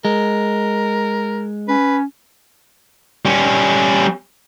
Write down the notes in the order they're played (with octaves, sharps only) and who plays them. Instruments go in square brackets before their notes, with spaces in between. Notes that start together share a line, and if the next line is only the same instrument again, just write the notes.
[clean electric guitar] G#3 [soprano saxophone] A#4
[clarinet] C#4 [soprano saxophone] B4
[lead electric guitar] G3 C#4